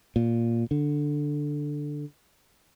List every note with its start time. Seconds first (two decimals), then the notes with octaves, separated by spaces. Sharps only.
0.16 A#2
0.71 D3